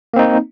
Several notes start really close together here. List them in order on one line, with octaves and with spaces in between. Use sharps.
A#3 C4 D#4